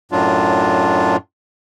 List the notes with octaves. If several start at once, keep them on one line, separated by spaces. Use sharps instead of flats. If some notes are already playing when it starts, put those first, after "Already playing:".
F#2 A2 F#3 D4 F4